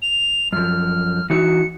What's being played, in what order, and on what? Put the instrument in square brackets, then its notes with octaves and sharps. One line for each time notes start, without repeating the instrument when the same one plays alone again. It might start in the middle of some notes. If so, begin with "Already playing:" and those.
[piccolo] F7
[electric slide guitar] F#2 F3 [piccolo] F6
[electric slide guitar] E3 D#4 F#4 [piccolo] C#7